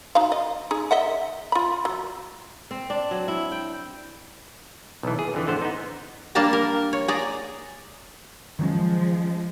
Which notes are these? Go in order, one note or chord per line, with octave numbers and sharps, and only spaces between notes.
D#4 F#4 F5
D#5
D#4 G#4
D#5 E5 F#5
F4 B5
F#3
C4
D4
F#3
E4
G5
B1 E3
G#4
F2 D3 E3
A1 D3 B3 C5
B3 D#4
G3 A#3 D4 F5 A5 A#5
A#4
C#5
G#4 D5 A#5
D#3 F3 F#3 G#3 C#4